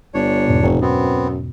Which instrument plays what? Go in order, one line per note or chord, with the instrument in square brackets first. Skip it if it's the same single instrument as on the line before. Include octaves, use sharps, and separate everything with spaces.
[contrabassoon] G1 [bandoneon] D4 C#5
[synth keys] E2 G#2 B2
[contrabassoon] F1
[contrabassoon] F#2 [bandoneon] B3 C4